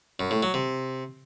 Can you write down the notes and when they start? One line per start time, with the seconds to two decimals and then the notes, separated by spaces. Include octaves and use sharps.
0.20 F#2
0.31 A2
0.43 F#3
0.54 C3